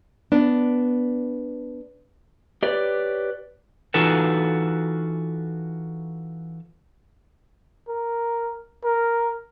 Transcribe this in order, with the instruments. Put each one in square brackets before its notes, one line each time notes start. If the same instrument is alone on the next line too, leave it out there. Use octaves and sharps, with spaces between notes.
[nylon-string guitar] B3 D4
[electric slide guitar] G4 B4 C#5 D5
E3 D#4 F4 F#4 A4 B4
[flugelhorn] A#4
A#4